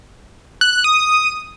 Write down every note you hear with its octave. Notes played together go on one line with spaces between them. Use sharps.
F#6
F#6
D#6